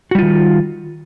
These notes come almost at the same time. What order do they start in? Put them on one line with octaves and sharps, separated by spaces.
F#4 G3 F4 D#3